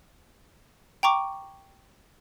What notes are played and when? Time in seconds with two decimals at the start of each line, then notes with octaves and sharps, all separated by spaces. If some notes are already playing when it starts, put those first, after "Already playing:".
1.03 G5 A#5 C#6 D6